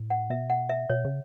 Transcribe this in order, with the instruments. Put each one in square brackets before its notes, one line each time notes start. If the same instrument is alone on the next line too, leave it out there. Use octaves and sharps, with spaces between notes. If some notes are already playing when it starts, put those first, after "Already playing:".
Already playing: [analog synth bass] A2
[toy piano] F#5
[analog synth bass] B2 [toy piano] E5
[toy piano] F#5
E5
[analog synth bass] B2 [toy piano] C#5
[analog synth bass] C#3